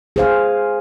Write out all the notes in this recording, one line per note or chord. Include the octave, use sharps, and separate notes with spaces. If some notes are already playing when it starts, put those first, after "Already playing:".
G#4 C5 F5